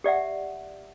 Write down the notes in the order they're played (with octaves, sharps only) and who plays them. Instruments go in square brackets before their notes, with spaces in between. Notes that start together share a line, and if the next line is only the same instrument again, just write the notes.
[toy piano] G4 D5 E5 F#5